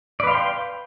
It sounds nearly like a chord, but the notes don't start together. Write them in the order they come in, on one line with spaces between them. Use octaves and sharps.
D5 B4 F5 C6 G5